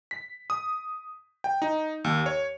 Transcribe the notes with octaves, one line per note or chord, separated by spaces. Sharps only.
B6
D#6
G5
D#4
D#2
C#5